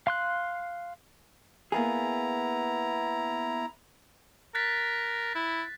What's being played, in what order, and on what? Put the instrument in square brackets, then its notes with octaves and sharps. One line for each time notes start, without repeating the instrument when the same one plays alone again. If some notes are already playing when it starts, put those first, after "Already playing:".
[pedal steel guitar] F5 C6 F#6
[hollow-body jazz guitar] A#3 B3 G#4 [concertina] E4 A#5
[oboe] A#4 [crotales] F#6 A6 B6
[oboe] E4